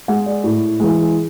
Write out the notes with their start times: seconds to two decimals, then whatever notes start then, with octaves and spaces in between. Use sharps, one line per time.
0.08 G#3 F#5
0.26 D5
0.44 A2
0.80 E3 G#3